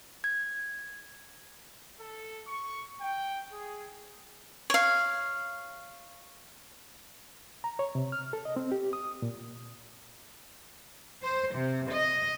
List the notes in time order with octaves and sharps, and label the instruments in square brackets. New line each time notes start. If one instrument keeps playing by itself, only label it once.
[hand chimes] G#6
[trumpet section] A4
C#6
G5
G#4
[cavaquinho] C#5 F5
[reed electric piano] A#5
C#5
C3
F6
A4
D#5
C4
G4
D#6
A#2
[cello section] C5
C3
D#5